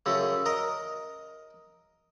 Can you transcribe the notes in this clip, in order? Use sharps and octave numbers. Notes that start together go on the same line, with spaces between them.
F#2 C#3 A3
A#4 D#5 A#5